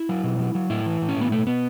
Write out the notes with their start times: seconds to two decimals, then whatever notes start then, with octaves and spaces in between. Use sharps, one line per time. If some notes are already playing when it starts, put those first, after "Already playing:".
Already playing: E4
0.09 F#3
0.23 B2
0.39 F#3
0.55 F#3
0.70 A2 E4
0.86 E3
1.02 A2
1.09 C#4
1.16 A2 B3
1.31 B2 A3
1.47 B2 B3